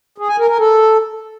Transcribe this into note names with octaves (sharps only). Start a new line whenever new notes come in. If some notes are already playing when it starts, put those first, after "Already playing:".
G#4
G#5
A#4
A#4
A4